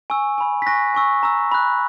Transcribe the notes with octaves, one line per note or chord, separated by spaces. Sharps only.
G#5 C#6 E6
G#5 B5 E6
B6
G#5 C#6 F#6 A#6
G#5 C#6 E6
A#5 E6
B5 F#6